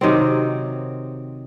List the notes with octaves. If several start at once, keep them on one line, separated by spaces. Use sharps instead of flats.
C3 D#3 F#3 C4